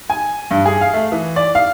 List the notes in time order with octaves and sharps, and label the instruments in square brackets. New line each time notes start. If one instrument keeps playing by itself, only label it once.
[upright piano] G#5
G2
G#4
F5
A3
E3
D5
F5